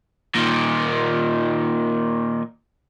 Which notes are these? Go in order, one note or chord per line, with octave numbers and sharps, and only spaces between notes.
A#2 D#3